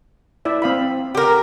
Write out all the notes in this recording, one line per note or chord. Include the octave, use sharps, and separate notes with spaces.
E4 D5 E5
C4 F5 B5
G4 A#4